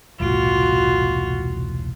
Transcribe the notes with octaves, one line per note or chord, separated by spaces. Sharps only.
E1 C2 A2 F4 F#4